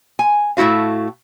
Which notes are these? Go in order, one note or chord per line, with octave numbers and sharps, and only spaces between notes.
G#5
A2 A3 E4 F#4 F5